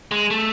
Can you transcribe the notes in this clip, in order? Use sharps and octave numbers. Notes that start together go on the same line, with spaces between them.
G#3
A3